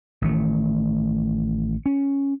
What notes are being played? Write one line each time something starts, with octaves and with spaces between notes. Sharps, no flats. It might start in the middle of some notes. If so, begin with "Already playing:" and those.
A1 D#3 A3
C#4